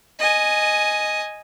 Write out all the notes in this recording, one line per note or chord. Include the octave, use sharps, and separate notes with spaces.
D#5 G#5